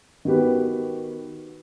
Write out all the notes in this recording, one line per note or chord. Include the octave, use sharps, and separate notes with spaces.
D#3 B3 F#4 G4 B4